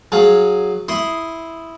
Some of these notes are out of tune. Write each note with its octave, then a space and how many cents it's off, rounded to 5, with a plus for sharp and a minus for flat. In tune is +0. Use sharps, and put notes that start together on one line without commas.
F#3 +0 G#4 +0 F5 +0
E4 -5 C6 -5 D#6 +0